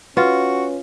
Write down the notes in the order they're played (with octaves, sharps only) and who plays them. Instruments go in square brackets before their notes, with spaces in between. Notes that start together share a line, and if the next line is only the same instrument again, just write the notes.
[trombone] C#4 [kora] F4 [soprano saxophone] F#4 [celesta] B4